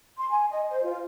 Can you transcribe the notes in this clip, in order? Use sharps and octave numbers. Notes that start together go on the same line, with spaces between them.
C6
G#5
D#5
C5
F4